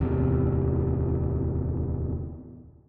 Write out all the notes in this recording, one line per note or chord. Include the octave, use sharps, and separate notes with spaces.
D1 E2 C3